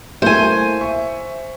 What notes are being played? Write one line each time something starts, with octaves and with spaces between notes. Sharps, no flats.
A3 A#3 E4 C5 G#5
E5 C#6